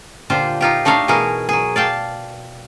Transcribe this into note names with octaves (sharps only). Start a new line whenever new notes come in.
A#2 D3 F4 G4 C5
D#4 F4 G4
A3 D4 D#4 C#5 F5
B2 E3 D#4 G#4 A#4
F#3 G#4
D5 F5 G5 A5